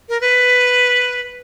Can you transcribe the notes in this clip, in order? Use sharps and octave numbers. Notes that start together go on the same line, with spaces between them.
A#4
B4